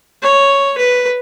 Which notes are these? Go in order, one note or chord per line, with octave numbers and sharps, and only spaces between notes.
C#5
B4